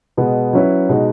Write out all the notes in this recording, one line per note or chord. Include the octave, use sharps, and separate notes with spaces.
B2 G#3 B3
F#3 C#4 E4 B4
B2 G#3 D#4 F#4